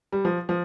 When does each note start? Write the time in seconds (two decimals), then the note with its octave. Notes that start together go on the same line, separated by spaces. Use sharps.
0.12 G3
0.25 F3
0.49 F3